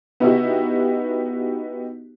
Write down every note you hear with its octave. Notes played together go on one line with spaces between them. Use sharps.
B3 D#4 E4 F#4 G4